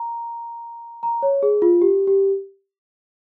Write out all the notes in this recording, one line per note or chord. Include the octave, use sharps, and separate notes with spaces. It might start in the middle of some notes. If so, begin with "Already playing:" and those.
Already playing: A#5
A#5
C#5
G#4
F4
G4
G4